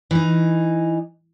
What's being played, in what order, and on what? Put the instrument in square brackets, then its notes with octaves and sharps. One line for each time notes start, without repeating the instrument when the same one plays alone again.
[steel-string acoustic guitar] E3 D#4